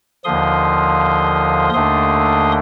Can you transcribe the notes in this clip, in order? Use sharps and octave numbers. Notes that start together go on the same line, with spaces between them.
D#2 D3 F3 C6 D#6
D#2 D3 A3 D4 C6 D#6